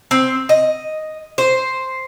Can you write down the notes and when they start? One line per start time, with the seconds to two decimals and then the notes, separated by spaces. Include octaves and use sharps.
0.11 C4
0.49 D#5
1.38 C5